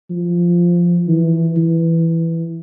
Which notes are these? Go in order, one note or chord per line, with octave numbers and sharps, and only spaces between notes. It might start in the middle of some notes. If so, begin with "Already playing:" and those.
F3
E3
E3